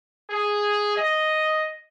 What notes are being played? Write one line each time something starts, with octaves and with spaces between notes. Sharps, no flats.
G#4
D#5